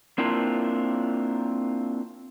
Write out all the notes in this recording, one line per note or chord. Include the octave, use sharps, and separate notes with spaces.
A#3 C4 D4 E4 F4 A#4